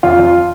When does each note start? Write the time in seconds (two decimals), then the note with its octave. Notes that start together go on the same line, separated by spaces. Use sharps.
0.03 F2 F4
0.19 F2